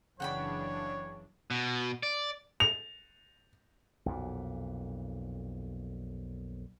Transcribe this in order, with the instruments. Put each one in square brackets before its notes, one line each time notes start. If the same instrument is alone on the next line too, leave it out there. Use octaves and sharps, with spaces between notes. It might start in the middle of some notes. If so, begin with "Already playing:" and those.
[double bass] F#1 E3 [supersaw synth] C#3 D4 [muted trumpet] C#5 [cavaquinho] F#5 G5 B5
[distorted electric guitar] B2
D5
[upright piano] F7
[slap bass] B1 F2 A#2